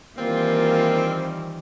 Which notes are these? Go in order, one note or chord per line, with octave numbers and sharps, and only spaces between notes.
D#3 E3 G3 A#3 C4 F4